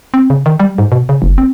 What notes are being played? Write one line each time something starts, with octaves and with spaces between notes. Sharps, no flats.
C4
C#3
D#3
G3
G#2
B2
C#3
F#1
C4